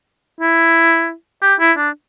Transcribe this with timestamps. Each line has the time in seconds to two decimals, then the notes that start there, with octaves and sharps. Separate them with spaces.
0.41 E4
1.42 G4
1.60 E4
1.77 D4